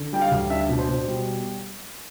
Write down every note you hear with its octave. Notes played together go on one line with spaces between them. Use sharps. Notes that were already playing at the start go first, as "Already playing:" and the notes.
Already playing: D3
G3 G5
F5
D2
D4 E5
B2
C5
B2
G3